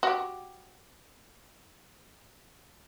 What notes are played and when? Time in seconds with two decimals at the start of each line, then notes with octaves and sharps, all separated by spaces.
0.03 F#4 G4